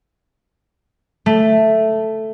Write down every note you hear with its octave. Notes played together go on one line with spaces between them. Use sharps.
A3